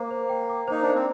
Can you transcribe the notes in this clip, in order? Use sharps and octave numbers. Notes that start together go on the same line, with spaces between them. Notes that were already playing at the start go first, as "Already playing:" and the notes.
Already playing: A#3 C5 D6
C5
G5
D6
D#4 C5
D4 C5
C4